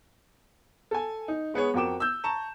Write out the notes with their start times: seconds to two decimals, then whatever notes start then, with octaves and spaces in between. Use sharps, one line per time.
0.91 A4 G#5
1.28 D#4
1.54 G#3 B3 G#4 C#5
1.74 F2 F#4 A#4 G5 D6 E7
2.00 E6 G6
2.24 A5 A#5 C#6 E7